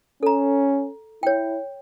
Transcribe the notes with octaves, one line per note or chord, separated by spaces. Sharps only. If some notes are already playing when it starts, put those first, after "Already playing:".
C#4 A4 A#5
E4 C#5 G5